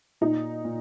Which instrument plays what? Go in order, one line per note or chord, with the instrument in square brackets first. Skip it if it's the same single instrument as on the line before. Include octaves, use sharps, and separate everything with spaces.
[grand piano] A#2 [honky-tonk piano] D#4
[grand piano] A#2